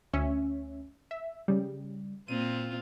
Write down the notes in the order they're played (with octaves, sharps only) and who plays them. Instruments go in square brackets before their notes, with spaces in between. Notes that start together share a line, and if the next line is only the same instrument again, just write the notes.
[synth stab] D2 C#4 E5
E5
C#3 G3
[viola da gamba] A#2 C4 F4 [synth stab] D#7